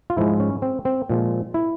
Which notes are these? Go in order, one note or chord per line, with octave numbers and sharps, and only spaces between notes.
F4
G#2 F3 G#3 E4
C#4
C4
C4
A#2 F3 G#3
E4